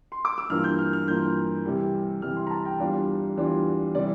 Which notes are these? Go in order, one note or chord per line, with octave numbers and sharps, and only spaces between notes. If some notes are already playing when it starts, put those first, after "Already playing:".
C6
D6
E6
G2 E3 A#3 F4 F6
G6
F6
F6
G2 E3 A#3 F4 G6
C3 E3 G3
C3 E3 G3 F6
C6
A#5
A5
G5
E2 E3 G3 D4 F4 F5
E2 E3 G3 D4 F4
C3 E3 G3 D5